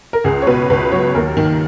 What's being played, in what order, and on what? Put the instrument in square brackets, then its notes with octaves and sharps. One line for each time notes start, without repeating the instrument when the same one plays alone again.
[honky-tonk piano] A#4
C#2 G#4
C#5
B2 B4
C#2 B4
F#3 C#5
D#2 A#4
D#3